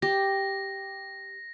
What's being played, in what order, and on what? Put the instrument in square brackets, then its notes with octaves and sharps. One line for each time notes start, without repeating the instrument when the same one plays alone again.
[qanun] G4 [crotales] A#6